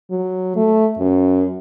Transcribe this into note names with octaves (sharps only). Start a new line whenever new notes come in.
F#3
A3
F#2